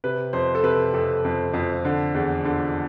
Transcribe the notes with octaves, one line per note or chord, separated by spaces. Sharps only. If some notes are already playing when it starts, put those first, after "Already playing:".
C3 B4
F2 C5
A4
C3 B4
F2 A4
F2
F2
D3
E2
D3